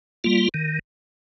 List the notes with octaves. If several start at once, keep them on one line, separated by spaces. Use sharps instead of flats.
G3 A#3 F4
D#3